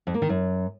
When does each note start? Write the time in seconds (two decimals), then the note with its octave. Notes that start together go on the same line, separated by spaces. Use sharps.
0.07 F2
0.14 A#3
0.22 D#3
0.29 F#2